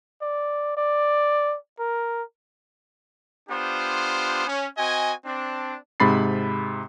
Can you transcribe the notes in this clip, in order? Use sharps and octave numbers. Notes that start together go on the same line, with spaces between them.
D5
D5
A#4
B3 D4 F4 G4 C5
C#4
C4 F#4 D#5 G#5
C4 D4
G#2 C3 B5 A6 C7